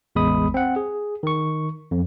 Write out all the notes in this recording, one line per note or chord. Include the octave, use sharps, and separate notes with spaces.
A1 E2 G#3 B5 D#6
C4 F#5
G#4
D#3 C#6
F2